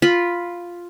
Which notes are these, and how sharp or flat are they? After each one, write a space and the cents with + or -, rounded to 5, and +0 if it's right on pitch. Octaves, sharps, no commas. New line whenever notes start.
F4 +0 B5 +0